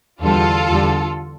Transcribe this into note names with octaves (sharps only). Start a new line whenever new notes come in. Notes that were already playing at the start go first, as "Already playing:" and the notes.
E2 D3 G3 F4 A4
E2 D3 G3